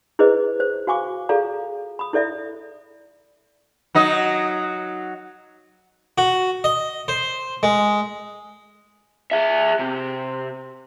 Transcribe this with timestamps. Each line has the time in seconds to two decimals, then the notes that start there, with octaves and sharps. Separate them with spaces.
0.19 E4 G#4 B4 C5 D#5
0.60 C5
0.87 F#4 F5 G#5 C#6 D6
1.29 F4 G#4 A4 D5 F5 A#5
1.99 B5 D#6
2.13 E4 A4 D5 E5
3.95 F#3 D#4 D#5
6.18 F#4
6.64 D#5
7.08 C5
7.63 G#3
9.31 G#4 E5
9.80 C3